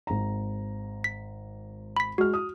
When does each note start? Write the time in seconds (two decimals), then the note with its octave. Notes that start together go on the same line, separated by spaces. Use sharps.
0.07 G#1 A#5
1.04 B6
1.97 B5 B6
2.18 G#3 F#4 F6
2.34 D#6